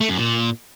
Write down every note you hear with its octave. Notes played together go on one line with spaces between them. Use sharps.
A3
F#2
A#2